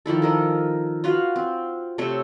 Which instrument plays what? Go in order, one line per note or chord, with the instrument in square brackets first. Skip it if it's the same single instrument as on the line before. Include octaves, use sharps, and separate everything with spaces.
[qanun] D#3 F3 E4 A4
A4 A#4 D#5
F4 F#4 B4 F5
C4
C3 A3 C#5 E5